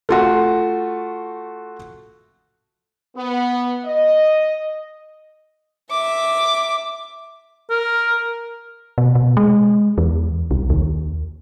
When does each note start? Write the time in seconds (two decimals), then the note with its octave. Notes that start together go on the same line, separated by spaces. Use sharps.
0.09 A3 F4 F#4
3.16 B3
3.85 D#5
5.90 E5 D6
7.70 A#4
8.98 B2
9.15 B2
9.37 G#3
9.98 E2
10.51 C2
10.70 D#2